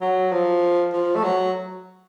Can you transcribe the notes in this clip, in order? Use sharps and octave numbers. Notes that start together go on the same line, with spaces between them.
F#3
F3
F3
A3
F#3